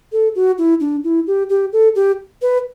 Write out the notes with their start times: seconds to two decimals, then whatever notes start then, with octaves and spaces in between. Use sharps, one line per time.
0.12 A4
0.36 F#4
0.58 E4
0.80 D4
1.04 E4
1.27 G4
1.49 G4
1.73 A4
1.95 G4
2.42 B4